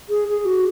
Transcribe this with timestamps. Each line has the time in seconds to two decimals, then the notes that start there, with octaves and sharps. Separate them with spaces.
0.09 G#4
0.28 G#4
0.45 F#4